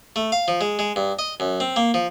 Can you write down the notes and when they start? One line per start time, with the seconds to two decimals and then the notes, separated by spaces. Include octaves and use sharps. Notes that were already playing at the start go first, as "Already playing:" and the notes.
0.16 A3
0.32 F5
0.48 F3
0.61 G#3
0.79 G#3
0.96 G2
1.19 D#5
1.40 F#2
1.60 C4
1.76 A#3
1.94 F3